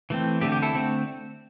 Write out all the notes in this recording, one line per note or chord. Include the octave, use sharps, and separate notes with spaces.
E3 A3 C4
D3 A3 C4 G4
G4
E4 A4
D3 A3 C4